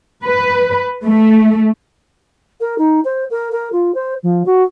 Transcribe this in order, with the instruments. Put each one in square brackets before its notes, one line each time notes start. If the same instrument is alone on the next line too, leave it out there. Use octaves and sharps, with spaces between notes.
[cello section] B4
A3
[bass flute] A#4
D#4
C5
A#4
A#4
F4
C5
F3
F#4